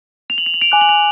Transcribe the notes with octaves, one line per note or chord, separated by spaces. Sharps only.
F7
F#7
F7
F#7
D7 F7
G#5 D6 F#6
F#7
F7